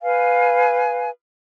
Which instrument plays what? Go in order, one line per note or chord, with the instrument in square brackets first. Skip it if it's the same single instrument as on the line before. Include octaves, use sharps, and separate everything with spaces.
[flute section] B4 F5 G#5